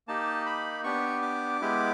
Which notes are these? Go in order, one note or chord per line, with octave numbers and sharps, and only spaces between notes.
A#3 D#4 G4 A5
B5
B3 D4 G4 C#6
D6
G#3 B3 E4 G4